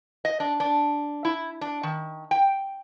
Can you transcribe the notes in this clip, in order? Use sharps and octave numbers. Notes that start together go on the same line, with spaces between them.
D#5
D4
D4
E4
D4
D#3
G5